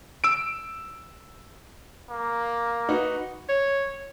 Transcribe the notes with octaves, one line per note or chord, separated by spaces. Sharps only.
E6 D7
A#3
D#4 F#4 B4
C#5